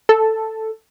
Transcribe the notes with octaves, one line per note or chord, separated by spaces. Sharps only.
A4